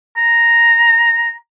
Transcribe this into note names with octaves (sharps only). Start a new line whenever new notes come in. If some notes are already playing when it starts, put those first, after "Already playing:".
A#5